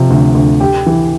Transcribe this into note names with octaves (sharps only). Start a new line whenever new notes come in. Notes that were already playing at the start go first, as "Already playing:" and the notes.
Already playing: C3 F3
D2
D2
G4
E3